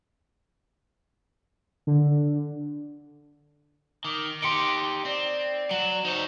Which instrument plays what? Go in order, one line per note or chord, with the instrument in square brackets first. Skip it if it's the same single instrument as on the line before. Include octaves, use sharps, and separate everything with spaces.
[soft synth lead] D3
[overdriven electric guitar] D#3 [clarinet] D6
[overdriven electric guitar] D#4 G4 [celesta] C6 C#7 D7
[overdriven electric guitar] C4 [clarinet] D5
[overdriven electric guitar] F#3 [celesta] E7 F#7
[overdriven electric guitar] D#4 C#5 [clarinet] C5